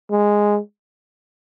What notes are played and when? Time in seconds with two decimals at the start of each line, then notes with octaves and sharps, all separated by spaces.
0.11 G#3